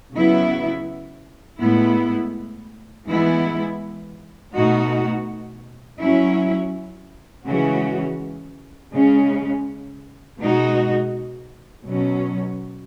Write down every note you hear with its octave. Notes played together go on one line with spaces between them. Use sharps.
C#3 F#3 B3 E4
A2 G#3 B3 E4
E3 G#3 B3 E4
B2 A3 D#4 F#4
F#3 C#4 E4
C#3 E3 G#3 C#4 F#4
C#3 G#3 C#4
B2 G#3 D#4 F#4
B2 F#3 C#4